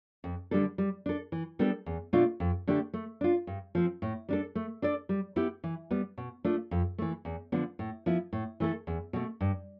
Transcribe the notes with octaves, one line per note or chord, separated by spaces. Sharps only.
F2
D3 G3 D4 A4
G3
D4 A4
E3
G3 B3 D4 A4
E2
B2 A3 D4 F4
F2
D3 A3 D4 G4
A3
D4 F4
G2
F3 C4
A2
G3 D4 A4
A3
D4 A4 D5
G3
B3 E4 G4
E3
G3 B3
B2
A3 D4 F4
F2
E3 A3
E2
D3 F3 B3
A2
F3 B3 E4
A2
E3 A3 E4 A4
E2
B2 A3
G2